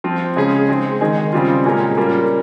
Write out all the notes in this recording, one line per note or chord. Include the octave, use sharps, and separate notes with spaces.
F3 C4 F4
C#3 G#3 C#4 G#4
G#3 C4 D#4 G#4
D#3 G#3 D#4 G#4
C#3 G3 C4 F4
A#2 G#3 C#4 G4 A#4
G3 A#3 C#4 F4 A#4